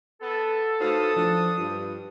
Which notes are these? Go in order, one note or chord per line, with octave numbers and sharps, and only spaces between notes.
B3 A4
A2 D#4 F#4 B4 C5 F5 D#6
F3 D4
G2 F4